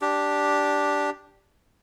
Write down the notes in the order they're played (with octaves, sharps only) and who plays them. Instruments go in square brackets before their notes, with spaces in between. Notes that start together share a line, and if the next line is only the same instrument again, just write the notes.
[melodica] D4 G4